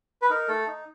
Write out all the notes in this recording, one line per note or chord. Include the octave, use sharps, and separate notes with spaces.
B4
D#4 A#4
A3 A4
D#4